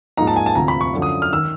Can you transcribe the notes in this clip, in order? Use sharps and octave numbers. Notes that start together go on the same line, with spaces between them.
G#2 F3 A#3 D#4 A#5
A5
G#5
A5
D2 C3 F3 A#5
B5
C#6
F#2 D3 F3
D#6
F6
D#3 E6